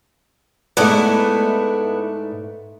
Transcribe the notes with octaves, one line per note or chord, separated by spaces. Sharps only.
G#2 A3 B3 D4 E4